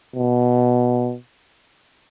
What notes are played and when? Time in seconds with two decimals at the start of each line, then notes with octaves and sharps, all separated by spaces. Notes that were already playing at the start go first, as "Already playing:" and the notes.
0.16 B2